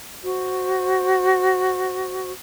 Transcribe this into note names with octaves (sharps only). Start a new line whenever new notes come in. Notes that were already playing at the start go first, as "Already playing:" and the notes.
F#4 C5